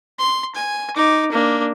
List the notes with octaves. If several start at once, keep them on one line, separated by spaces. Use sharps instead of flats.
C6
G#5
D#4 D6
A#3 D4